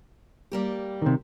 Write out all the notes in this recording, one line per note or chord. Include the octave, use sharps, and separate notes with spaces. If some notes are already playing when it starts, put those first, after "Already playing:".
G3 A#3 G4
C3 D#3